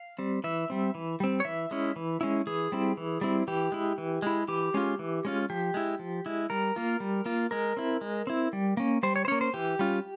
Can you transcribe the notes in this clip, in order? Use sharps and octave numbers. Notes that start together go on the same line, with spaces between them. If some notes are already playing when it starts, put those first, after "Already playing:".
Already playing: F5
G3 C4
E3 E5
G3 C4
E3
G3 C4
C#5
E3 E5
G#3 C#4 E4
E3
G#3 C#4 E4
E3 G#4
G3 C4 E4
E3
G3 C4 E4
E3 G4
G#3 E4
E3
G#3 E4
E3 G4
G#3 C#4 F4
E3
G#3 C#4 F4
F3 G4
G#3 E4
F3
G#3 E4
G3 A#4
A#3 F4
G3
A#3 F4
G#3 A#4
C4 E4
G#3
C4 E4
G3
A#3 C#4
G3 C5
C#5
C5
A#3 C#4 C#5
C5
E3 G4
G3 C#4 F4